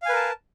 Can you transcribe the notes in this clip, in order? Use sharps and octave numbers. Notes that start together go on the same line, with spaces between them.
A#4 B4 F5 G#5 A5